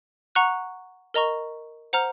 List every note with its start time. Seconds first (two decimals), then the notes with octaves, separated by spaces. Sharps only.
0.35 F#5 A#5 C#6 F#6
1.14 A#4 D#5 A#5 C#6
1.93 C5 F#5 A#5 F6